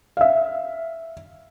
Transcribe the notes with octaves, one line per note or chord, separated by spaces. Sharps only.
E5 F5